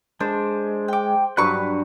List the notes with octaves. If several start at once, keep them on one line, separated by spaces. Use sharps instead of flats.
G#3 D4 C5
G5 D6
G2 F#3 B4 C#6 F#6